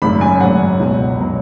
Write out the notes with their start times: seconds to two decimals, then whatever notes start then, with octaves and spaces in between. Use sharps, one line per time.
0.02 G#1 F#2 C#3 F#3 B5
0.21 G#5
0.40 G#1 F#2 C#3 F#3 F#5
0.79 C#2 B2 F#3
1.18 B2 F#3